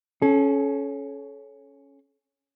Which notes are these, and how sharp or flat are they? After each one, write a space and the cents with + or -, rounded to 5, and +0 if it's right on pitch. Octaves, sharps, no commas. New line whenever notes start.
C#4 +0 A4 -35